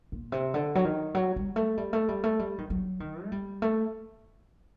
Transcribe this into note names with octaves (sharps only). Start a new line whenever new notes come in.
A#2
C3
D3
F#3
D#3
F#3
G3
A3
G3
A3
G3
A3
G3
D#3
F#3
D#3
A3
G3
A3